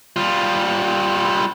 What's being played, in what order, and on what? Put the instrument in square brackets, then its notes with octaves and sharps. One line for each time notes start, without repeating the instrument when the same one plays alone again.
[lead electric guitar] G3 F4